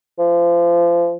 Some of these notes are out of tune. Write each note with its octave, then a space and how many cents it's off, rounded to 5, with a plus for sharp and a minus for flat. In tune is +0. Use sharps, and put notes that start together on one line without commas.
F3 -30